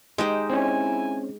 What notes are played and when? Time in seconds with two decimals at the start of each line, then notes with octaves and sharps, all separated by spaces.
0.18 G#3 D#4 G4 C5
0.50 C4 C#4 E4 G#5